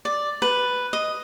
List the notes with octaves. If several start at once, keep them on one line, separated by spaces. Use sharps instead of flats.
D5
B4
D#5